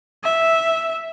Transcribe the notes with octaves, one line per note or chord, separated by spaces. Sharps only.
E5